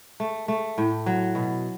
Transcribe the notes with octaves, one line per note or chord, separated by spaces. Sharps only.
A3
A3
A2
F#3
B2